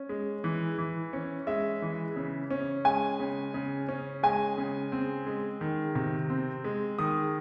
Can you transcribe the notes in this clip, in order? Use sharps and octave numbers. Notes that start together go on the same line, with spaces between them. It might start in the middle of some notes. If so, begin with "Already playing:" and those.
Already playing: C#4
G#3
E3
E3
C#4
G#3 E5
E3
C#3
C#4
G#3 G#5
C#3
C#3
C#4
G#3 G#5
C#3
C4
G#3
D#3
C3
C4
G#3
D#3 D#6